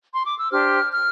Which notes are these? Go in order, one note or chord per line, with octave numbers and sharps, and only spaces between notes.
C6
D6
E6
D4 G4 C5 F6
F6